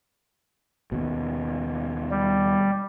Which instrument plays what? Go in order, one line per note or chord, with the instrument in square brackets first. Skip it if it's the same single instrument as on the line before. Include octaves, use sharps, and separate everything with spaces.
[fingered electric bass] D#2 B2
[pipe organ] G3